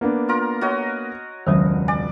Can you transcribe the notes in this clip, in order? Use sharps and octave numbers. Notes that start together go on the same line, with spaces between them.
A#3 B3 D4
F4 A#4
F#4 C#5 D#5
E1 C#2 D#3 F#3 G#3 D#6
D5 G#5